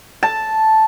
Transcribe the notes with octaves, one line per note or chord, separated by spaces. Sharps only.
A5